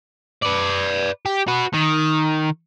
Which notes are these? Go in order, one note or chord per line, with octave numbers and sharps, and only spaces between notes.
B4 D5
G4
F#4 B4
D#3